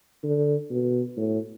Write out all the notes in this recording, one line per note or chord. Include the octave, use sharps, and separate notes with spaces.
D3
B2
A2